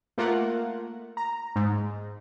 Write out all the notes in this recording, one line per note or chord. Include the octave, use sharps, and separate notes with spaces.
A3 A#3 F4 A#4 F#5
A#5
G#2